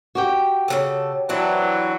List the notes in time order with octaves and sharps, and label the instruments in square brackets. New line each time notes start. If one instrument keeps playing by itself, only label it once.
[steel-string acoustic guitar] F#4 G4 G5
[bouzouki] C#3 E3 A4
[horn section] E3 F#3 [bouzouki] C4 D4